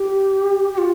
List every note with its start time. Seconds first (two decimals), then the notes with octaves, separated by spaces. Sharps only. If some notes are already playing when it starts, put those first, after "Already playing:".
Already playing: G4
0.74 G4
0.78 F4